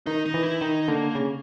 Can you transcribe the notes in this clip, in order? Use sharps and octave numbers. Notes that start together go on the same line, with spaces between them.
D#3 D#4
D#4
E3
E4
D#3 D#4
D3 A#3
C#3